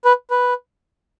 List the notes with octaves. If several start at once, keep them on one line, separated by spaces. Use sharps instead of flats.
B4
B4